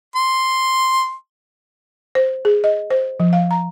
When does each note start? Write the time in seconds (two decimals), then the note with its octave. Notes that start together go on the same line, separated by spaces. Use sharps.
0.15 C6
2.15 C5
2.45 G#4
2.64 D#5
2.91 C5
3.20 F3
3.33 F5
3.51 A#5